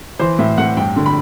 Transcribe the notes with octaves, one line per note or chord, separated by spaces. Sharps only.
E3 C5
A2 E5
A2 F#5
G2 G5
D3
B5